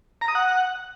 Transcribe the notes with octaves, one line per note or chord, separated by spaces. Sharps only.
A#5
D#6
F#5